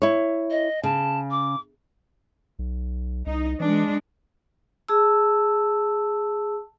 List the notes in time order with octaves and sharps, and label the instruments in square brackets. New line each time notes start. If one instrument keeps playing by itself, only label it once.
[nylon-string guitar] E4 C#5
[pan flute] D#5
[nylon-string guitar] C#3 [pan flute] A5
[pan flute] D6
[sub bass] B1
[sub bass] C2 [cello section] D#4
[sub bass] E3 [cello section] G#3 D4
[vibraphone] G#4 A5 E6